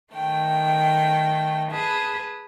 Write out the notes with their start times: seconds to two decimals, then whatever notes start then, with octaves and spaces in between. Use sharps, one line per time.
0.12 D#3 A3 G5
1.70 G#4 B4 A5